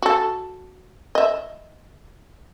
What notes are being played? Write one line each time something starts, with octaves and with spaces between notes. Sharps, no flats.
F#4 A4
D#5 E5